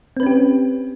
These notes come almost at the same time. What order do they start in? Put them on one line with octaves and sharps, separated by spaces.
C4 B4 C#4 G4